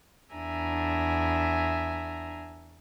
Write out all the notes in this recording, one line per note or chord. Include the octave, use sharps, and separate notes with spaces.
E2 D4 E5 G#5 A#5